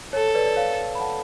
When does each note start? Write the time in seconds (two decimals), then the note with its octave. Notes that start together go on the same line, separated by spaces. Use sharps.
0.13 A4 C#5
0.35 B4 D5
0.46 D5
0.56 C#5 F5
0.95 B5
1.00 F#5 A5